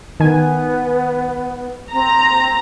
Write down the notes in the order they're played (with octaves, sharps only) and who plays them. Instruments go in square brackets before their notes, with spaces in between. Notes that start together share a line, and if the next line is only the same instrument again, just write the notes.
[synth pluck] D#3 G#5 [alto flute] B3
[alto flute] C4 [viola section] A#5